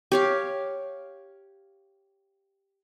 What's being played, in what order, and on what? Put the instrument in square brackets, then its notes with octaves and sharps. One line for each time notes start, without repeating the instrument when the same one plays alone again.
[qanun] G4 C#5 F5